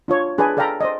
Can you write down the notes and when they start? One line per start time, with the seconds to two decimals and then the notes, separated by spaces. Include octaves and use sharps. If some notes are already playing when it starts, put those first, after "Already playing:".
0.08 D4 F4 C#5
0.38 D4 G#4 B4 D5 G#5
0.57 A4 D5 F5 G5 A#5 B5
0.81 C5 D5 D#5